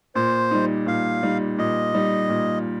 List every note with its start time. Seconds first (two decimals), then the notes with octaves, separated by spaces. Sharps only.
0.15 A#2 C5
0.51 G3 D#4
0.86 A#2 F5
1.23 G3 D#4
1.58 A#2 D#5
1.94 G3 D#4
2.29 A#2